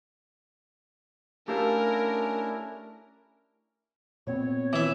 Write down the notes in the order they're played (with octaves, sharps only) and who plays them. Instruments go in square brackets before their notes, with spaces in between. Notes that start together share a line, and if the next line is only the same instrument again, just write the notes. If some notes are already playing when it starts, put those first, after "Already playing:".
[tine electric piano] A3 [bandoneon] C#4 D4 E4 [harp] G4 A4 F5 [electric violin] A#4
[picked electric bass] A#2 B3 C4 [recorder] C#5
[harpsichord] E3 E5